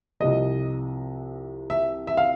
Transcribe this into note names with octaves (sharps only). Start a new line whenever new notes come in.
C2 C3 F3 D#5
E5
E5
F5